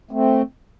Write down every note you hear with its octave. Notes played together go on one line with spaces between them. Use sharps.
A3 C4